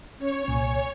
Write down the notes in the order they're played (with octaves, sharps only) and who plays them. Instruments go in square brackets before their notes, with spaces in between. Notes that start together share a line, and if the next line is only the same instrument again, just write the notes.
[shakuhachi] C#4 [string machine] C#5
[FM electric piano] C2 A#2 [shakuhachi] G#5